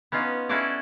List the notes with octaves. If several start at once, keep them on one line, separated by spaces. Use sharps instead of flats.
B3 C#4 D#4 F4
C#4 E4 F#4 G#4 A4 D5